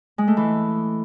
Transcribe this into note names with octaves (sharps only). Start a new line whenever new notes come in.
G#3
A3
E3